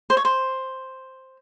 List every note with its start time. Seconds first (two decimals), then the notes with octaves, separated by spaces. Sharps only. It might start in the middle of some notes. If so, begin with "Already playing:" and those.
0.10 C5
0.17 C#5
0.25 C5